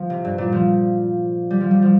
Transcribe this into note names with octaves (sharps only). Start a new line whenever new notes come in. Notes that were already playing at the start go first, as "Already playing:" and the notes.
Already playing: F3
C3
G2
A#2
F3
G3
F3
G3
F3